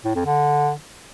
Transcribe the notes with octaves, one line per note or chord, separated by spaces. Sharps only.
A2
F2
D3